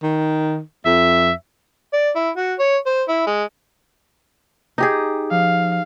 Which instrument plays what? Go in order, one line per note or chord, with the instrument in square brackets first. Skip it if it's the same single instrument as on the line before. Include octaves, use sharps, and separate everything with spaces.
[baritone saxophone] D#3
[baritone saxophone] F2 [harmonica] E5
[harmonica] D5
E4
F#4
C#5
C5
E4
G#3
[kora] D#4 G4 G#4
[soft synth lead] F3 [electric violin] F5